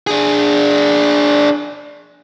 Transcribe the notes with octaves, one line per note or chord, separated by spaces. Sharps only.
D4 G#4